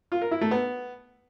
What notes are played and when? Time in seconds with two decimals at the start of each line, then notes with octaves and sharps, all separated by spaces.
0.12 F4
0.22 A#4
0.31 E4
0.41 A3
0.51 B3